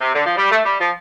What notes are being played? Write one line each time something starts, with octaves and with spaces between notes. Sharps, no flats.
C3
D3
F3
G3
A3
G3
F3